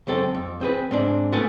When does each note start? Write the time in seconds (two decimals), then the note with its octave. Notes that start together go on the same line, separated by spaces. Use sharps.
0.07 C#2 F#2 C4 A4
0.35 F2
0.61 C4 G#4 B4
0.91 G#2 C4 D4
1.32 A3 B3 F#5 G#5 A5